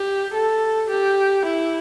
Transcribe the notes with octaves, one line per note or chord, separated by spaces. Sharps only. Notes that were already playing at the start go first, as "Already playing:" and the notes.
Already playing: G4
A4
G4
E4